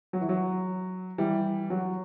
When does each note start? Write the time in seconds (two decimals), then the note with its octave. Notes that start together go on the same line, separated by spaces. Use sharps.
0.13 F#3
0.21 E3
0.29 F#3
1.18 E3 G3
1.70 F#3